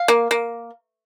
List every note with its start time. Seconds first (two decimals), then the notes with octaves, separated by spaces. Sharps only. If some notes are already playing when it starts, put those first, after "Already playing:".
Already playing: F5
0.08 A#3
0.31 A#3